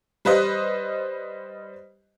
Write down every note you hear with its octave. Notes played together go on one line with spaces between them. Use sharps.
G3 B4 C5 D#5 F#6